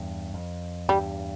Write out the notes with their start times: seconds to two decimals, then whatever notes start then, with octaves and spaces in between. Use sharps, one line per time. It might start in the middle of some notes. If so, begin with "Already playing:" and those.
Already playing: E2 G2
0.34 F2
0.89 E2 G2 G3